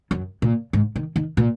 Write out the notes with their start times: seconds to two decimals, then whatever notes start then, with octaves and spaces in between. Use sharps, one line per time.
0.11 F#2
0.42 A#2
0.73 G#2
0.96 D#3
1.16 D#3
1.37 A#2